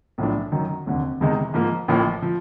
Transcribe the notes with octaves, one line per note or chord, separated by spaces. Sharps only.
B1 A2 F3 A3 D4
F#2 D#3 F#3
F1 D#2 D3
F1 E2 C3 D#3 G#3
G#2 F3 A#3
A1 A2 F3 A#3
F3